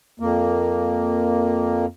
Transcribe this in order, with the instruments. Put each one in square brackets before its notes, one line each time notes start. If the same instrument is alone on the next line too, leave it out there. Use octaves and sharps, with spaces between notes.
[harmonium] F2 A#3